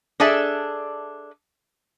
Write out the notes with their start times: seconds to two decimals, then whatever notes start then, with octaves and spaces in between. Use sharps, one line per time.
0.20 D4 G#4 A4 D5 E5